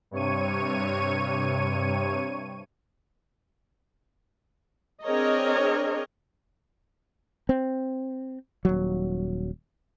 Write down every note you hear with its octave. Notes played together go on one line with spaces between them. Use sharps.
G2 C3 C#5 C#6 D#7
C4 D4 G#4 A#4 C#5 D#5
C4
D#1 F#3